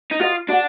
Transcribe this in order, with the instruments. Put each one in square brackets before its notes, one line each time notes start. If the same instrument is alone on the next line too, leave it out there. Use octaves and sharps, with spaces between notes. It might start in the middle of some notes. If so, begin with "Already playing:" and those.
[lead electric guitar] D#4
[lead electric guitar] F4 [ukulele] F#4 A#4 D#5
[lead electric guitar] D4 [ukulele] F#4 D5 F#5